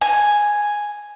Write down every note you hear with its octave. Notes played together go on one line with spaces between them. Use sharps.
G#5